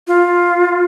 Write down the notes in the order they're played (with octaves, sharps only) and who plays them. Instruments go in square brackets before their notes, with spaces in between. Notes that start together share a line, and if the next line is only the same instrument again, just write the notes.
[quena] F4